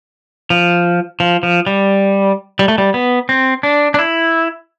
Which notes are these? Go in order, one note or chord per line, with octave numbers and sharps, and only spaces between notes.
F3
F3
F3
G3
G3
A3
G3
B3
C4
D4
D4
E4